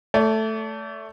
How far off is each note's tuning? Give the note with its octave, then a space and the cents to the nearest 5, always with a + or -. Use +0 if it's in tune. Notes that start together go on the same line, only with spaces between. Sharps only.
A3 +0 D5 -40